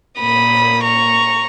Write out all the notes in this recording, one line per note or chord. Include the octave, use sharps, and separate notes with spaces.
A#2 A#3 B5 D#6
A#5 C#6